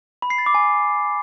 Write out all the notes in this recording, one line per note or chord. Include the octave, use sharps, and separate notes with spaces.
B5
C7
A6
D6
G#5